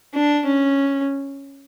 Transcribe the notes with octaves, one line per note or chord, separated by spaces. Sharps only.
D4
C#4